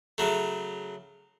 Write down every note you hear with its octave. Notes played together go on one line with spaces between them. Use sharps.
C#3 F#3 A3